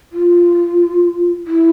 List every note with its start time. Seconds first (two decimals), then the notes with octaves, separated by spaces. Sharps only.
0.12 F4
1.47 E4